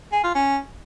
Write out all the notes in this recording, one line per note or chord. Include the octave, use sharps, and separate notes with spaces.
G#4
F4
C#4